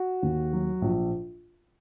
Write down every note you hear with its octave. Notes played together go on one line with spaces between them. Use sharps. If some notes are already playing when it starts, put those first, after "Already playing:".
Already playing: F#4
D#2
F#3
A#1